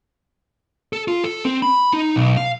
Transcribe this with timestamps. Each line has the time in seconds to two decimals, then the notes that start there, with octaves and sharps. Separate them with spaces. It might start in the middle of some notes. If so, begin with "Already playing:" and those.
0.93 A4
1.08 F4
1.24 A4
1.45 C4
1.62 B5
1.93 D#4
2.16 B1
2.37 F5